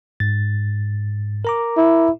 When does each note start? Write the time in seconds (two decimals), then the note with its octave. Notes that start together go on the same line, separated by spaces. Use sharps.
0.20 G#2 A6
1.45 A#4 A#5 D6
1.77 E4